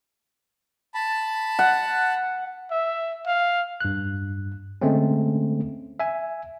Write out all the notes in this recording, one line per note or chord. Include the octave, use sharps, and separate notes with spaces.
A5 B5
F#5
E5
F5
G2 F#6
D3 G#3 A3 C4 C#4
E5 G#5